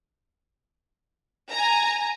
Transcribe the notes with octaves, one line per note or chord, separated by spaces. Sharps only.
G#5 A#5